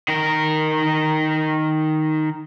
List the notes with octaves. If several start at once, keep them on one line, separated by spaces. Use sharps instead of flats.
D#3 A#4